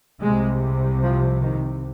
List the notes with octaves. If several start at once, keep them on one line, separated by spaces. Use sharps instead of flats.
C2 C3 G#3
F3
D#3